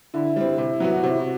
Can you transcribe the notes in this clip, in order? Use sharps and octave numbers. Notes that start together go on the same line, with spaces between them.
D3 E4
G3 C4
C3
F#3 B3 F#4
C3 F#4
E4
F#4